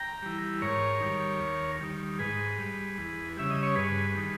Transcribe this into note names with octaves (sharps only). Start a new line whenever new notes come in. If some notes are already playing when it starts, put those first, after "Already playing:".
Already playing: G5 A#5
E3 G3
G#2 A#4 C#5
D#3 G3
D#2
D#3 G3
G#2 G#4 B4
G3
E2
C#3 G3 E5
D#5
C#5
G2 G#4 B4
D#3 G3